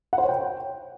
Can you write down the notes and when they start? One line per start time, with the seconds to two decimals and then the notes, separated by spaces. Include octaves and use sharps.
0.13 F#5
0.18 C5
0.23 C#5
0.29 G5